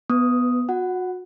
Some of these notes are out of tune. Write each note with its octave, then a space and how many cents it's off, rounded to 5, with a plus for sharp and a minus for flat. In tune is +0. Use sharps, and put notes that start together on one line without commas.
B3 +0 B4 +30 D#6 +0
F#4 -30 F#5 +5